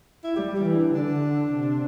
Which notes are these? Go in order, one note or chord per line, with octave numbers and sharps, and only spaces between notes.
E4
G3 G4
G4
E3
D4
D3 D4
C3